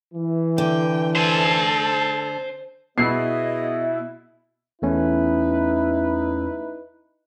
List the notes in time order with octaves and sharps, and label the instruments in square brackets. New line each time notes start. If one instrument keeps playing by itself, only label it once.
[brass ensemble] E3
[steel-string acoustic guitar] D3 [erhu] G5
[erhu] A4 [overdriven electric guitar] C5 G#5
[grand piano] B2 [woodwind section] B3 G#4 D#5 [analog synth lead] E4 [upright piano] C7
[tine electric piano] E2 A3 C#4 [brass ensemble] D#4 E4 B4